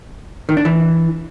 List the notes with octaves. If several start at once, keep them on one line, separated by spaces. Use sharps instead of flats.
D#3
D4
E3